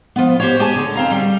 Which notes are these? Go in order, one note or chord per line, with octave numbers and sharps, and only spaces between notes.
F3 B3
G4 C5 C#5
G4 G#4 C#5 G#5 A5
D3
C4 F5 A#5
G3